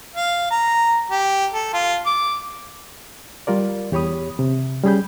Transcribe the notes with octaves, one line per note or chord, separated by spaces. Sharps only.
F5
A#5
G4
A4
F4
D6
G3 F4 A#4 D5
E2 G4 C#5 B5 D#6
C3
G3 C#4 G#4 B5 G6